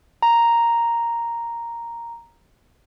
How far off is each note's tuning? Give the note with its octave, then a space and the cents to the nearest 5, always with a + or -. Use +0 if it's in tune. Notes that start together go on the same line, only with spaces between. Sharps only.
A#5 +0